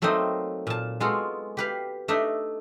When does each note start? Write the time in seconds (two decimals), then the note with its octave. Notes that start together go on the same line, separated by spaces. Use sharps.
0.02 F#3 A3 A#3 C4 D#4
0.67 A#2 A5
1.00 G#3 B3 F4 F#4 A4
1.57 G4 B4 F5
2.08 A3 D4 D#4 D#5 E5